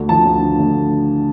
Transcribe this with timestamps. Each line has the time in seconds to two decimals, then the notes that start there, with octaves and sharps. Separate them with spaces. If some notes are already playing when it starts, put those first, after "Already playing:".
Already playing: D2 D3
0.09 F3 A5
0.25 D2
0.42 D3
0.59 D2